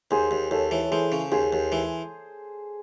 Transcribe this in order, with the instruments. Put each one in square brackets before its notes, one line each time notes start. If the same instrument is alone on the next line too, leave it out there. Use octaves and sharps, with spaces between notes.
[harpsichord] D#2 [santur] G#4 C5
[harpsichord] D#2
[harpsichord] D#2 [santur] A4 C#5
[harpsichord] E3
[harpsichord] E3 [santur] G#4 C5
[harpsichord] C#3
[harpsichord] D#2 [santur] G#4 C5
[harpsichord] D#2
E3